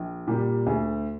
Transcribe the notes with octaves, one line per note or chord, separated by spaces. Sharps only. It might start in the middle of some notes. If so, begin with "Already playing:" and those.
Already playing: A#1
A#2 G3 G4
D2 G#4